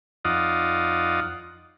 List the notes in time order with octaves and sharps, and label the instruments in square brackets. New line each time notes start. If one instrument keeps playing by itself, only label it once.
[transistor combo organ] F2 D#4 F4 D5 F#5 D#6